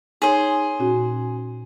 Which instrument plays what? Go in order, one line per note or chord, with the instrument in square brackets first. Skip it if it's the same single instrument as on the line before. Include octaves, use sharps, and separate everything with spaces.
[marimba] D#4 C#5 [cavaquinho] G#4 C5
[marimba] A#2 C#4 F#4